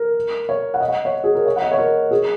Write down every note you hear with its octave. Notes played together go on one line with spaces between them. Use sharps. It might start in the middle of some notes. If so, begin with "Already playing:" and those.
Already playing: A#4
C#5
F#5
D#5
F#5
C#5
G#4
A#4
C#5
F#5
D#5
C#5
A#4
G#4